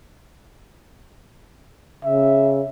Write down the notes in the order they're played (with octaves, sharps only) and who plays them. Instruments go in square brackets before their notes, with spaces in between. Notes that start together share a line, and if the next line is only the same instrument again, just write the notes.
[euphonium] C#3 [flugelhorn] E5